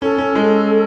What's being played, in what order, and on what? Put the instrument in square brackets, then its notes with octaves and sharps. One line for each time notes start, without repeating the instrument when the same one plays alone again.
[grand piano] C#4 [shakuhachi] A4
[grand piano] C#4
G#3